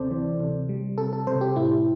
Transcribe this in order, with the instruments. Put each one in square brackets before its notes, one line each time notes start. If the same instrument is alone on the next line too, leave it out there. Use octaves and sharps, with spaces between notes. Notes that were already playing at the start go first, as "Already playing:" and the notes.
Already playing: [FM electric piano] D2 C3 C4 A4 C5 D5
E3
C3
G3
C3 A4
A4
C3 C5
G4
A2 E4